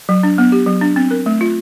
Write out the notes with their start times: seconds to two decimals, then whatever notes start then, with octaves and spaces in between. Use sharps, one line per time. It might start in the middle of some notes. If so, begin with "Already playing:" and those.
0.09 F#3
0.23 D4
0.38 B3
0.52 G4
0.67 F#3
0.81 D4
0.96 C4
1.11 A#4
1.26 A3
1.41 F4